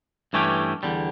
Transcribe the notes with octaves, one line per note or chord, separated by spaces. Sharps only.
G2 E3 A3 C#4 G4
E2 D3 G3